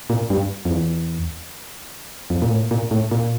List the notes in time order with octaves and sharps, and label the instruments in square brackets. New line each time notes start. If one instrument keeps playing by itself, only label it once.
[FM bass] A#2
G2
F2
E2
F2
A#2
A2
A#2
A2
A#2